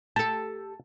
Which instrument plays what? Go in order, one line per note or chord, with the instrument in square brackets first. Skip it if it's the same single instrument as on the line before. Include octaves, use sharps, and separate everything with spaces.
[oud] G4 A4 [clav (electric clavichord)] A5